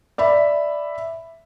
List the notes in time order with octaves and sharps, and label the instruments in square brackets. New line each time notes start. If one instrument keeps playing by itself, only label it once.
[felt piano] D5 E5 B5